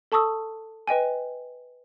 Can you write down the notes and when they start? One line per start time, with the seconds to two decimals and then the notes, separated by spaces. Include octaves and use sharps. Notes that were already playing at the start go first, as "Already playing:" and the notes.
0.12 A4 A5 C#6 D#6 E6
0.87 B4 D#5 G5 G#5